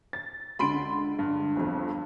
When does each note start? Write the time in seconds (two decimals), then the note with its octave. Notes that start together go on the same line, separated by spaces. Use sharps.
0.13 A6
0.59 C#2 D3 B5 C6 D7
1.19 G2
1.56 G1 F2